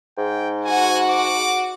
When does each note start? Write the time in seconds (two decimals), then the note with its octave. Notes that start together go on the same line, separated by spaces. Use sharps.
0.18 G#2 G5
0.65 F#4 F#5 G#5
1.09 D6